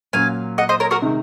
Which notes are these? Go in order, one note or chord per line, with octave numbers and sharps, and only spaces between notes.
A#2 F#3 C#4 F5 G#5
D#5 F#5
C5 D#5
A#4 C#5
F#4 A#4
C3 D#3 G#3 D#4